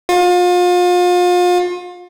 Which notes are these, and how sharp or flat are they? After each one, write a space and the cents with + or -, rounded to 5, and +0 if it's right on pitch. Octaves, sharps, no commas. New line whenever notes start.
F4 +35